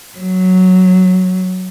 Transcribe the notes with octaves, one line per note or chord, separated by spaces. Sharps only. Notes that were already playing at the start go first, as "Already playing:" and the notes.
F#3